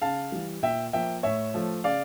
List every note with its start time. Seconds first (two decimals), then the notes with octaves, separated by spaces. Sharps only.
0.02 C#3 F5 A5
0.32 E3 G3
0.63 A#2 E5 G5
0.93 F3 A#3 E5 G5
1.23 A2 C#5 E5
1.54 F3 A3
1.84 C#3 D5 F5